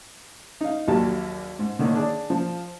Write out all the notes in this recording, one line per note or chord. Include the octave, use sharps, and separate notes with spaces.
D#4 F5
A#1 D#2 F#3 G4 A5
G#2
D3 D#3 A#3 C#4
D4 G#4 D5
F3